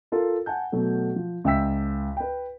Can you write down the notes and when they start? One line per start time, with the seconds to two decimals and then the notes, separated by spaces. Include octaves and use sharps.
0.12 F4 A4 A#4
0.46 F#5 G#5 A5 G6
0.72 B2 F#3 A3
1.16 F3
1.44 C#2 E5 G5 E6 B6
2.17 B4 G5